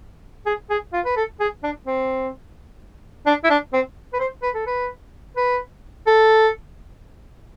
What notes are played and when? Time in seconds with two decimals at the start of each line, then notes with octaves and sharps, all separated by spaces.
0.46 G#4
0.70 G#4
0.93 F4
1.05 B4
1.16 A4
1.40 G#4
1.63 D4
1.86 C4
3.26 D4
3.44 E4
3.50 D4
3.73 C4
4.14 B4
4.20 C5
4.43 B4
4.55 A4
4.67 B4
5.36 B4
6.07 A4